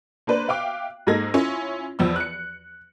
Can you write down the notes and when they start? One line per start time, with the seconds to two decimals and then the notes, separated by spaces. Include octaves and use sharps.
0.27 A#3 D4 B4 C5 D5
0.48 E5 F5 G5 D6 F#6
1.07 G#2 G#3 A#3 A4 G#6 A#6
1.34 C#4 E4 F4
1.99 E2 F3 E6
2.16 F#6 C#7